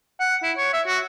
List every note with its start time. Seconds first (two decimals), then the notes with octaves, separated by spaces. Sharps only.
0.20 F#5
0.43 E4
0.57 C#5
0.73 E5
0.86 F#4